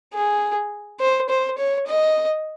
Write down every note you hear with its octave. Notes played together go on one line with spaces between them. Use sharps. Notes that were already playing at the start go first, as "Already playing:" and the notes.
G#4
C5
C5
C#5
D#5